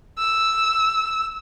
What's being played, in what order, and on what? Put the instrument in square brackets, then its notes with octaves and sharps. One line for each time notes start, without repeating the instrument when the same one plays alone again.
[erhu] E6